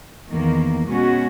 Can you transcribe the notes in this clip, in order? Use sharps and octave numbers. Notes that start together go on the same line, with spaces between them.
E2 D#3 A#3
B2 G#3 C#4 F#4